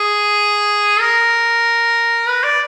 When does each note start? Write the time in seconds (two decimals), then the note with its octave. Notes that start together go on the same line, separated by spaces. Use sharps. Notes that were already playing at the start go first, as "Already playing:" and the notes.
Already playing: G#4
1.00 A#4
2.28 B4
2.43 D5